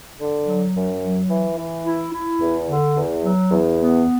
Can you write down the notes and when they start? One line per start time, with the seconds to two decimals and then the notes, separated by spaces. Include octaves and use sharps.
0.20 D3
0.47 F#3
0.76 F#2
1.03 F#3
1.30 E3
1.58 E3
1.85 E4
2.13 E4
2.40 E2
2.68 D3
2.96 E2
3.24 F#3
3.51 E2
3.78 B3